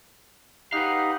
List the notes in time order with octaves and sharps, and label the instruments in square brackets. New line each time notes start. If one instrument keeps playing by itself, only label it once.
[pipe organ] D#4 [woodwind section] G4 F#5 [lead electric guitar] B4 F5